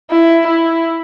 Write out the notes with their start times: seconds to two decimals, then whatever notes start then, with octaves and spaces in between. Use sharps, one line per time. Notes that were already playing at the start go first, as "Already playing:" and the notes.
0.11 E4
0.47 E4